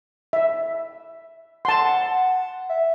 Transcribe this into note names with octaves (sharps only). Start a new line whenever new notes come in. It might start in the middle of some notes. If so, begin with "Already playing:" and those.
E5
F#5 A5 C6
E5